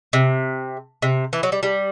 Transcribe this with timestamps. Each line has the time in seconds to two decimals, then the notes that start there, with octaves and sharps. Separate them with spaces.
0.13 C3
1.02 C3
1.33 E3
1.43 F#3
1.52 G3
1.63 G3